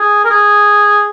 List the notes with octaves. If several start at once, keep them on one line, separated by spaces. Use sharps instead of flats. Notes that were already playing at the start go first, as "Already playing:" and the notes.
Already playing: G#4
A#4
G#4